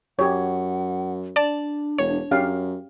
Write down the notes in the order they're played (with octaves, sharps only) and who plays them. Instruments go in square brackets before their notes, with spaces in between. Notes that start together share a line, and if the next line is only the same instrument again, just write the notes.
[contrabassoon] F#2 [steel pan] G4 C#5 [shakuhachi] F#5
[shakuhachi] D4 [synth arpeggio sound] D5 A5
[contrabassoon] E1 [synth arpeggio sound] C#5
[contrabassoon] F#2 [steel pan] C#4 G4 F5